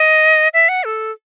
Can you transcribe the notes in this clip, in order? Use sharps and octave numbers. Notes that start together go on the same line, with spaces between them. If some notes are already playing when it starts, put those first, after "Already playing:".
Already playing: D#5
E5
F#5
A4